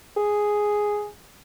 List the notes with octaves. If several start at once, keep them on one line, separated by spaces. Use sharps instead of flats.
G#4